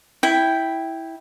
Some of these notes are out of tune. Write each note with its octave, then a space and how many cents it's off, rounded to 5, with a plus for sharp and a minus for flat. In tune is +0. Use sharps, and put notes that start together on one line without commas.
E4 -5 G5 +0